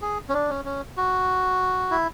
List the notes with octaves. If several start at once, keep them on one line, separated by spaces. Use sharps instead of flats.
G#4
C#4
D4
C#4
C#4
F#4
E4